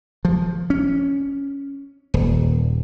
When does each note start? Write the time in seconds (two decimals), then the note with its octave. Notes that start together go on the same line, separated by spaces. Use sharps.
0.25 F3
0.70 C#4
2.14 D#1